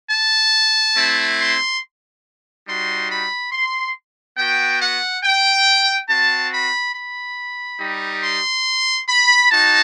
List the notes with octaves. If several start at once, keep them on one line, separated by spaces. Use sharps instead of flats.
A5
A3 C4 E4
C6
G3 D#4 F#4 C6
B5
C6
B3 F#4 G5
F#5
G5
C4 F#4 A5
B5
B5
G3 D#4 G4
C6
B5
D#4 F#4 A5